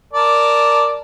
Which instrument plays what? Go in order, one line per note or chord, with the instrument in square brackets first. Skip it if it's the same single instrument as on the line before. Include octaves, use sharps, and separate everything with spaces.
[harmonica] A#4 D5 A5